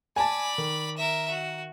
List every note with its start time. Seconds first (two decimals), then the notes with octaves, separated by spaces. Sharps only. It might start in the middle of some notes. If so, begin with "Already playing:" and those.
0.16 D5 G#5 A5 B5
0.58 D#3
0.97 A#4 E5
1.30 F#4